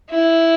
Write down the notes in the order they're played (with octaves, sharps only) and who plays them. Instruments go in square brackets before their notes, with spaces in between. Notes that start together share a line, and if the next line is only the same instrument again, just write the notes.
[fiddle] E4